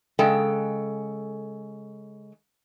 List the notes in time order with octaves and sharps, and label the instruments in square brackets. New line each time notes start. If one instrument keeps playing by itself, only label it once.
[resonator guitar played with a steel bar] C#3 G#3 A4 G5